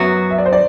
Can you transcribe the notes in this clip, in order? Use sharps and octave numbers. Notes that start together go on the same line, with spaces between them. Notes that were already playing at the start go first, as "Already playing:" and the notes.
Already playing: F#2 F#3 B3 F#4 E5
E5
D5
C5
D5